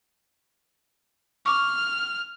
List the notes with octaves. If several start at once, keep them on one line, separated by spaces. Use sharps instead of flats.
C#6 D6 F6